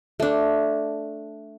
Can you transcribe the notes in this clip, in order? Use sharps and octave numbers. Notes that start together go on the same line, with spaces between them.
A3 D4